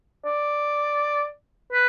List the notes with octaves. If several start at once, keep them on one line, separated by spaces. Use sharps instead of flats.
D5
B4